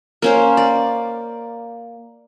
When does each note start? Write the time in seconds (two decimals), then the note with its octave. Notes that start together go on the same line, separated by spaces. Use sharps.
0.22 A#3 C#4 C5
0.57 D5